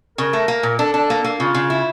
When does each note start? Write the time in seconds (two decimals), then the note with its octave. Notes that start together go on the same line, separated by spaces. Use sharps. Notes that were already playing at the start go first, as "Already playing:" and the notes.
0.18 C#3 A#4
0.33 A3
0.48 A#3
0.63 A#2
0.79 D4 A4
0.94 D4
1.10 A#3
1.24 A#3
1.40 C#3 F4
1.55 C#3
1.70 E4